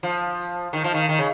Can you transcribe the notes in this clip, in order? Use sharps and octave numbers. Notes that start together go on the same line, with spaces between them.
F3
D#3
F3
D#3
D#3
C#3